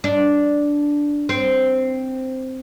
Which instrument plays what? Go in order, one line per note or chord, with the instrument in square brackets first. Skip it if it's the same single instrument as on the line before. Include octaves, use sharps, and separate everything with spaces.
[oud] D4
C4